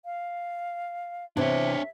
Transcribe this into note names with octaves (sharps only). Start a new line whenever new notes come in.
F5
C3 E3 B3 D4 C#5 E5